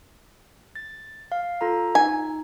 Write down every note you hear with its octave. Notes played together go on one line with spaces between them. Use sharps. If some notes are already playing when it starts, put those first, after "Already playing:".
A6
F5
F4 A4 A#5
D#4 G#5